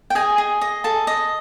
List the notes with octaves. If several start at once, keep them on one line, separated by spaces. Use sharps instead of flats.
G5
G#4 D#5 G#5
G#4
D#5
G#4 A4 A5
D#5